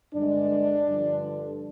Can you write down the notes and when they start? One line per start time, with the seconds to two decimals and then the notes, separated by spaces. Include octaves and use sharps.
0.14 G2 D3 G#3 D4
0.88 G2 D3 F3